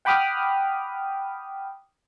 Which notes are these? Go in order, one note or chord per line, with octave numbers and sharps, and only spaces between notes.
F#5 G5 B5 D6 D#6 F6